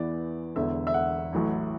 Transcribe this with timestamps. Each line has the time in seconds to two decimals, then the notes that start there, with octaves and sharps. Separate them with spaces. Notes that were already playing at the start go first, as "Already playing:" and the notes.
Already playing: E2 E3 B3 D5
0.55 E1 E2 D3 E5
0.87 E5
0.94 F#5
1.33 A1 A2 F#3